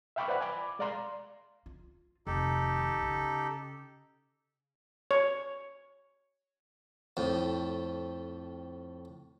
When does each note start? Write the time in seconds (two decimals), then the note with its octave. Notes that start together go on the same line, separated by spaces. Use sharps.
0.16 E5 F5 G5 B5 C#6 D6
0.28 B4 C5 D5 F#5 B5
0.41 G#5 B5 D6
0.79 G#3 D5 F5 A#5 C6
1.66 F4
2.27 F1 D#3 D#4 G4 A4
3.02 C#3
5.11 C#5
7.17 F2 A2